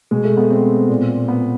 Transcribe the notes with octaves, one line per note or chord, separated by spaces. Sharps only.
B2 G#3
A3
B3
C4
A#2
B3